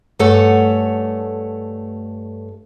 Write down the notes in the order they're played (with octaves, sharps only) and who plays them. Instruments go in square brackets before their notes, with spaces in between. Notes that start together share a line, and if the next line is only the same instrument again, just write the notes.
[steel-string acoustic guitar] G2 A3 A4 C#5 F#5 G#5